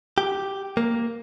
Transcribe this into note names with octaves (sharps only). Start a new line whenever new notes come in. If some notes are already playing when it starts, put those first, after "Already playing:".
G4
A#3